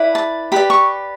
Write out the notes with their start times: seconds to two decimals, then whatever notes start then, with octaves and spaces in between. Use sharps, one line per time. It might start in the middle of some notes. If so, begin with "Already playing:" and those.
Already playing: E4 B4 D5
0.15 A5
0.52 G4 B4 D5 B5
0.70 C#6